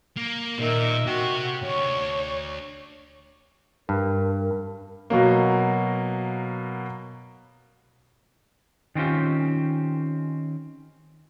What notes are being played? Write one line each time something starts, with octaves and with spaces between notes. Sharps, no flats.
A#3
A#2 D#3 E5
C3 F#4 G5
D2 C#5
G2 A#4
B2 F#3 A#3
D#3 C4 C#4 F4 G4